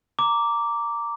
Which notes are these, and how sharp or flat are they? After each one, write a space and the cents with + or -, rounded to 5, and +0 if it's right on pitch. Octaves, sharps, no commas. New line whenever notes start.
A#5 -10 D6 -10